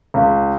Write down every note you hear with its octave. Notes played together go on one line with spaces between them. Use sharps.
C#2